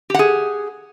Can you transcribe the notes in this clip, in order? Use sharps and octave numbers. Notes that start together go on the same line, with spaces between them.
G4 G#4 F#5